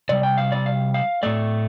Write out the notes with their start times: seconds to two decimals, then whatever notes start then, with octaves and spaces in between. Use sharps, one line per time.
0.09 C3 G3 D5
0.23 G5
0.38 F5
0.52 D5
0.66 F5
0.94 F5
1.23 A2 A3 D5